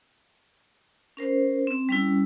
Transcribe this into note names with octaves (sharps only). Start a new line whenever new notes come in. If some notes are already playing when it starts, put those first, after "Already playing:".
C#4 A#4 C5
C4
G3 C#4 E4